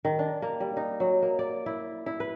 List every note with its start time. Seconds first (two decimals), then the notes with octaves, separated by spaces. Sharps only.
0.05 D#3
0.19 D4
0.42 A#3
0.60 G3
0.77 D#4
1.00 F#3
1.22 A#3
1.39 D5
1.66 E4
2.06 E4
2.20 B4